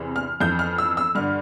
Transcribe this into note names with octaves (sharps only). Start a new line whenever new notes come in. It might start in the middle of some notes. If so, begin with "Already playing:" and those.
Already playing: E2 C3 E3
F6
F2 E3 G6
F6
E6
E6
G2 D3 F6